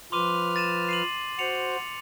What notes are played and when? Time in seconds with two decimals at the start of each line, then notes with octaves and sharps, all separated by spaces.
0.12 F3 B4 C6 D6 F6 D#7
0.56 A6 D#7 E7
0.89 C7 D#7 F#7
1.39 F#4 C5 C#7 F7